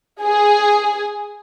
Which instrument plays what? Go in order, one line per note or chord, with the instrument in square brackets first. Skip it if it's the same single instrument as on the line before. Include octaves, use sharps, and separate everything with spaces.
[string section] G#4